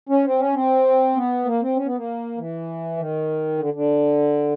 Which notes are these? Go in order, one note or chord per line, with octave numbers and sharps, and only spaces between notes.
C#4
C4
C#4
C4
B3
A#3
C4
C#4
B3
A#3
E3
D#3
D3
D3